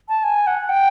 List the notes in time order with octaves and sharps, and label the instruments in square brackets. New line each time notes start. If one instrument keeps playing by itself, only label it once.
[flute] A5
G#5
F#5
G5